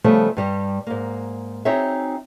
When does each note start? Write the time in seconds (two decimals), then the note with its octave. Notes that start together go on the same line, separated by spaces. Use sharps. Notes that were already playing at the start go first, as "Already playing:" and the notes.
0.04 C#3 F3 G3 A3 B3
0.37 G2 G3 G4
0.87 G#2 A#3
1.65 C4 D#4 F#4 G#4 C#5 E5